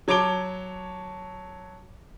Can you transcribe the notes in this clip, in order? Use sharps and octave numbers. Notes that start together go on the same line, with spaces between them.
F#3 C#5 A5 D6 D7 G7